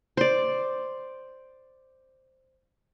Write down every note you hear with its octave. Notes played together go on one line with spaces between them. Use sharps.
C5 D5